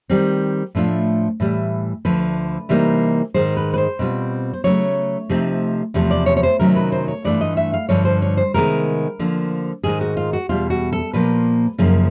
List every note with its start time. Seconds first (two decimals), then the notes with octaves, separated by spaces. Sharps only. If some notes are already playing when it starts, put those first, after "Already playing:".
0.10 D#3 G3 C4
0.75 A2 F3 A3 D4 F4
1.40 A2 E3 G3
2.05 D2 D3 F3 B4
2.69 C3 E3 G3 A#3 D#4
3.34 G#2 D#3 G#3 C5
3.57 B4
3.74 B4
3.78 C5
3.99 B2 G3 C4 F4
4.53 C5
4.64 C#3 F#3 A3 C#5
5.29 C3 F3 A3 C4 D#4
5.94 E2 C3 F3 A3
6.11 D5
6.26 C#5
6.37 C#5
6.43 C5
6.59 C3 D#3 F#3 A3 C#4 A#4
6.76 B4
6.92 C5
7.08 C#5
7.24 G2 E3 A3 D4 F4 D5
7.41 D#5
7.57 E5
7.73 F5
7.89 G2 D3 F3 C#5
8.05 C5
8.22 C#5
8.37 C5
8.54 C3 D#3 G#3 B3 A#4
9.19 D3 F3 A#3
9.84 G#2 D#3 G#3 G#4
10.01 F#4
10.17 F4
10.33 F#4
10.49 E2 B2 G3 F4
10.70 F#4
10.93 A4
11.13 A#2 F3 A#3 B4
11.78 F#2 C#3 F3 A#3